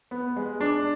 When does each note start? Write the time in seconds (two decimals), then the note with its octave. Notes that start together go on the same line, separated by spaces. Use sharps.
0.11 B3
0.37 G#3
0.61 D4